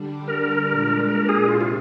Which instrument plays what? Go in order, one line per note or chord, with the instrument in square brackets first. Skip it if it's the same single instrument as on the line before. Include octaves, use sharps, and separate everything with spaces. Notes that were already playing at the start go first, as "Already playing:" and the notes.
Already playing: [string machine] D3 G3 D4
[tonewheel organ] A#4
[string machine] A#2 G#3 D4
[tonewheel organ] A#4
G#4
[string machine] C3 G3 D4 [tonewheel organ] F4
[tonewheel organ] F4